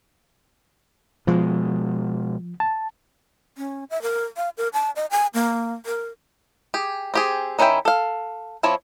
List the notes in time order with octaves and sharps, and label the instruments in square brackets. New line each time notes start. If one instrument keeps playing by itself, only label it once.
[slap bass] B2 G#3 [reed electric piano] F3
[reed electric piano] A5
[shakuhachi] C#4
E5
A#4
F5
A#4
A5
D#5
G#5
A#3
A#4
[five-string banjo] G4 G#4
C4 G4 G#4
D#3 C#4 E4 E5 G5
A4 F5
F3 C4 E4 C#5